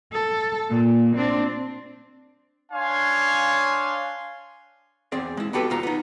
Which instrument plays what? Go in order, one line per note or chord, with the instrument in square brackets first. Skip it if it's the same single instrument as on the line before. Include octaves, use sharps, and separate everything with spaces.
[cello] A4
A#2
C4 D4
[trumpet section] D4 C#5 F5 G#5 C6
[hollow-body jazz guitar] E2 C4 G#4 D5
G#3 E4
B3 F#4 G4 A4 B4
E2 F4 A#5
B3 D#4